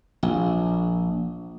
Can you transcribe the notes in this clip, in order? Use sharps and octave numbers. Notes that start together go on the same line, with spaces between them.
A#1